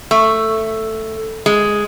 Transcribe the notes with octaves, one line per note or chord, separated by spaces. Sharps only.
A3
G#3